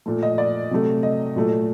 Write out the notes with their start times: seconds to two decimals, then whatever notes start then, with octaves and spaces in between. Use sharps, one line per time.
0.06 A#2 A3
0.23 D#5
0.38 D5
0.71 C3 F#3 A3
1.03 D#5
1.36 A#2 F#3 A3